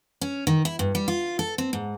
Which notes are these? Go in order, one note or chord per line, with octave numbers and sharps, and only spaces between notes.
C#4
D#3
E4
G2
G3
F4
A4
C4
G#2